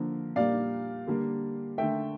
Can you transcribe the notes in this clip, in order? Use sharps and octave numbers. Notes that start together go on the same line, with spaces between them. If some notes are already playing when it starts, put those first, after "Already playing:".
Already playing: D3 F3 A#3
A#2 G3 A#3 D5 F5
D3 G3 A#3
D3 A3 E5 G5